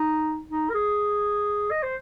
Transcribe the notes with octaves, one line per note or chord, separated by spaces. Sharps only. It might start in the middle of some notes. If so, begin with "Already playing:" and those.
Already playing: D#4
D#4
A#4
G#4
D#5
C5